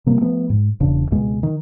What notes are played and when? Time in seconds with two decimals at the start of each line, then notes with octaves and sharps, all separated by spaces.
0.06 C3 G3 A#3
0.21 F3 A3 B3
0.50 G#2
0.80 E1 C#3 D4
1.11 C#2 B2 G#3
1.43 D#3